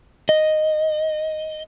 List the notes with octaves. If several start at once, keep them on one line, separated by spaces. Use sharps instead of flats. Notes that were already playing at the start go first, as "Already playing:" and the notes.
D#5